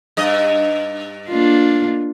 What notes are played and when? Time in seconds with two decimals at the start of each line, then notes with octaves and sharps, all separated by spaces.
0.17 G2 D#5
1.29 A#3 D4 F4